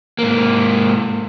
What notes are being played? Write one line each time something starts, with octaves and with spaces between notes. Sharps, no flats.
G#2 A#3